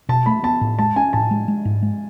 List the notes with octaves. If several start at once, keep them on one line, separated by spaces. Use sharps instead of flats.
B2 A5
A3 B5
B3 A5
A2
G#3 A5
C#4 G#5
A2 A5
G#3
G#3
G#2
G#3